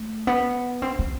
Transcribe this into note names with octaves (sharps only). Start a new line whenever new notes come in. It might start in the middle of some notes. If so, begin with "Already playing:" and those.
Already playing: A3
B3
C4
C4